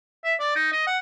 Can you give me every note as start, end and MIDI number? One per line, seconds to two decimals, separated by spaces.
0.25 0.35 76
0.40 0.55 74
0.56 0.70 63
0.72 0.87 75
0.87 0.98 78